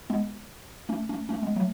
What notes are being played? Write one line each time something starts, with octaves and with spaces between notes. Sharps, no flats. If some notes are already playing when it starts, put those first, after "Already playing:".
G#3 B3
A3 C#4
A3 C#4
A3 C#4
G#3 B3
F#3 A3